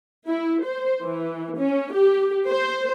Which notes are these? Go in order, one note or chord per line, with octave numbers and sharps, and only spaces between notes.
E4
C5
E3
C#4
G4
C5